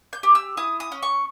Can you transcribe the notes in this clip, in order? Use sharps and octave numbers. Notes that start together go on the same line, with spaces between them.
G6
G4
E6
E4 D#6
D#6
C#4
C#6